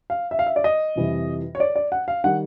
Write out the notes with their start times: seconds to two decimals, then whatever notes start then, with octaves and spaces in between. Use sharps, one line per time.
0.10 F5
0.31 E5
0.39 F5
0.46 E5
0.56 D5
0.64 D#5
0.96 F2 C3 E3 G3
1.55 C#5
1.60 D5
1.76 D5
1.92 F#5
2.08 F5
2.24 D#3 G3 F#5